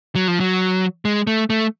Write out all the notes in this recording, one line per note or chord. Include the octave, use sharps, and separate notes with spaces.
F#3
F3
F#3
G#3
A3
A3